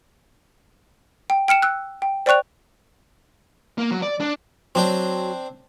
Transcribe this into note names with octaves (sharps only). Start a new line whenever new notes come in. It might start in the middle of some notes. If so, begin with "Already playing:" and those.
G5
G5 F6 C#7 E7
E6 F#6
G5
C5 D5 G5 C#6 F#6 F7
A#3
F#3
D5
D4
F#3 C4 D4 G5